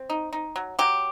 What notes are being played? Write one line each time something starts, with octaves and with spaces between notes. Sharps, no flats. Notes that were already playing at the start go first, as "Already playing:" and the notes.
Already playing: C4
D#4
D#4
F#3
F#3 G4